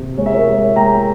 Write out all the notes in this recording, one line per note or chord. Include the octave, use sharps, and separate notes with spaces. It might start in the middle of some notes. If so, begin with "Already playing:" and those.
Already playing: C3
G#3 C#5
E5
A#4 C#5
G#3
G#3 G5 A#5